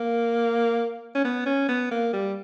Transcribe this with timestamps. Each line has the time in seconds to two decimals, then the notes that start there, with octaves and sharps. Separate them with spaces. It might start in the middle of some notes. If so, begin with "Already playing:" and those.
Already playing: A#3
1.15 C#4
1.24 B3
1.46 C#4
1.69 B3
1.91 A#3
2.14 G3